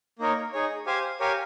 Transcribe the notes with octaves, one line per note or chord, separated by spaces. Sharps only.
A#3 D#4 A#4 C#5
D#4 G#4 C#5
G4 C5 F5 G#5
G4 A#4 C#5 F5 G#5